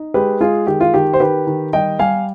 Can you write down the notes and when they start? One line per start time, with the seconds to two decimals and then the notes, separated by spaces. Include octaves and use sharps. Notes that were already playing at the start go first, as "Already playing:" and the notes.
Already playing: D#4
0.14 G#3 G4 B4
0.40 G#3 F4 G#4
0.67 D#3 G4
0.81 F4
0.94 D#3 G4
1.13 C5
1.20 D#3 G4 B4
1.47 D#3
1.73 G3 D#5 G5
1.99 G3 F5 G#5